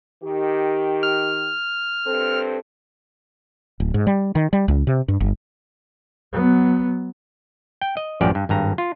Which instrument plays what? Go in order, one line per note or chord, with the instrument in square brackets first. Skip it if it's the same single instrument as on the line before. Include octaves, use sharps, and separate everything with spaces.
[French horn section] D#3 G4
[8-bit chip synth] F6
[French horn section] G2 C4 A4
[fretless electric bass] D1
G#2
G3
D#3
G3
C#2
C3
G2
G1
[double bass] F#3 B3
[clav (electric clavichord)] G5
D#5
A1 F#2 F3 G3 G4 D5
G2
G#1 G2 A#5
F4